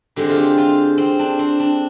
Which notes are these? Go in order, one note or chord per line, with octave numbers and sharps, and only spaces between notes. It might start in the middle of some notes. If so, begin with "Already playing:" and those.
D3 G#3 C4 G4
F4
G4
F4
C4
D4
C4
D4